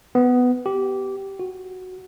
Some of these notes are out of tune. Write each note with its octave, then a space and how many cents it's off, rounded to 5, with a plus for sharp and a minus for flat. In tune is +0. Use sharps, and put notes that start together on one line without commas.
B3 +10
G4 -15
F#4 +0